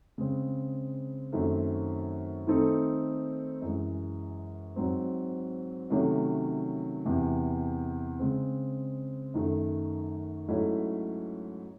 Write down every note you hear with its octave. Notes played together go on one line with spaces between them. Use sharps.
C#3 G#3 C4
F#2 D#3 F#3 A3 C4
D#3 A3 C4 D#4 A4
F#2 E3 G#3
G#2 F#3 C4
C3 D#3 F#3 A3 C#4
E2 C3 E3
C#3 G#3 C4
F#2 D#3 A3
G#2 F#3 A3 C#4 E4